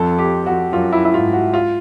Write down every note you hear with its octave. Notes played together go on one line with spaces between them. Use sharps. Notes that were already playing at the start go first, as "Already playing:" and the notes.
Already playing: F2 A4
G4
F#4
F#2 F4
E4
E4
G#2 F4
F#4
F4